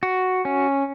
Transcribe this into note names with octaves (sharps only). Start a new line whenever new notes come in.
F#4
C#4